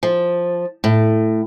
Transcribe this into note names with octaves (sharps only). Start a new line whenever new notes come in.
F3
A2